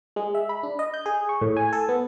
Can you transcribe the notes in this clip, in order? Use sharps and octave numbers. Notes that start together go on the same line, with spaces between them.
G#3
E5
B5
D4
D#5
G6
G#4
C#6
A2
G#5
A4
B3